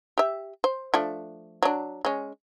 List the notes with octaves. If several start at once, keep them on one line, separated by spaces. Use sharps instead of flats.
G4 E5
C5
F3 A3 D4
F#3 D4
G#3 C#4